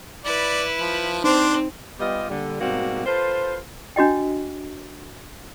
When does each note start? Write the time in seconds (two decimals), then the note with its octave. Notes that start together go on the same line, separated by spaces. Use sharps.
0.25 E4 B4 D5
0.79 F3
1.24 C4 D4 D#4 C5
2.00 G3 B3 F4 G4 D#5
2.29 A#2 D3 G3
2.60 G#2 B2 G3 A#3 C4 F#4
3.05 F4 A4 B4 C5
3.96 D4 F#4 D#5 G5